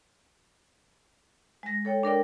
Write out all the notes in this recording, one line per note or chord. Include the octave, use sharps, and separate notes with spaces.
G#3 A#6
A4 C#5 G5
D4 A#4 D5 G5